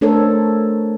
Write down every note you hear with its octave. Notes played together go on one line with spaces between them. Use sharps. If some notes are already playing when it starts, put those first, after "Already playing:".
A3 D4 A4 A#4 C5 C#5